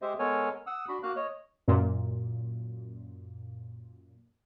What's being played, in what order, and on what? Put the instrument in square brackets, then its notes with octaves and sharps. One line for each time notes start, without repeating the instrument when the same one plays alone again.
[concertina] G#3 G4 C5 D#5 E5
G#3 B3 A4 A#4 C#5 G#5
F#5 D#6 E6
D4 F#4 B5
A#3 F#4 F5 F#6
C#5 D#5
[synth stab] F#2 A#2